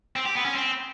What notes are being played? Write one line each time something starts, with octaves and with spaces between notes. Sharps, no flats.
C4
G4
B3
C#4
C4